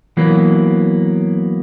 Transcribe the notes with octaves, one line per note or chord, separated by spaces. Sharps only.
E3 F#3 A#3 B3